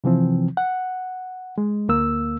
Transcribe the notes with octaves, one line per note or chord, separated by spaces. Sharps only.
C3 E3 F3 C4
F#5
G#3
D2 A#3 E6